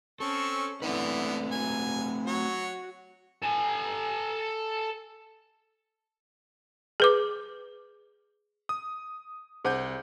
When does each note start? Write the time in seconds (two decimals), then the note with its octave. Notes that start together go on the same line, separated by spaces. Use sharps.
0.20 C4 C#4 A4 C#6
0.82 D3 E3 A3 B3 C4 B4
1.52 F#3 G#5
2.27 F#3 F#4 C#5
3.43 A4 G#5
7.00 G#4 B4 D6
8.69 D#6
9.65 C2 G#4 C5 F#5 A5 G6